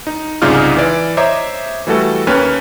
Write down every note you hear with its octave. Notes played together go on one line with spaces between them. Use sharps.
D#4
C2 G#2 C#3 D#4 F4 F6
E3 D5
C5 C#5 D#5 E5 A#5 D6
E3 G3 A3 F#4 A4
D#2 A#3 C#4 B4 F6